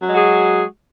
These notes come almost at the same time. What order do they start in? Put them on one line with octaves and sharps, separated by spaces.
F#3 G#3 F#4 G#4